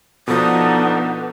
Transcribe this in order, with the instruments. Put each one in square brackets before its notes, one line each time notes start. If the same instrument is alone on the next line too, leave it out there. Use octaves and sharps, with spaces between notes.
[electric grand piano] B2 F3 [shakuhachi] B3 [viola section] D4 D#4 [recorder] A4